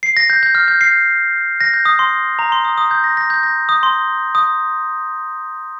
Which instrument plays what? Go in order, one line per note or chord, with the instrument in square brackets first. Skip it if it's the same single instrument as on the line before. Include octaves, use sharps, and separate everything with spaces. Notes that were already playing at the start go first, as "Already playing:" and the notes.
[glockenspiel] C7
A#6
G6
G6
F6
G6
C7
A#6
G6
D#6
C6
A#5
C6
D#6
D#6
G6
A#6
A#6
G6
A#6
D#6
C6
D#6